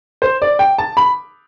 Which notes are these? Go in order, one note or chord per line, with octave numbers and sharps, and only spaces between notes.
C5
D5
G5
A5
B5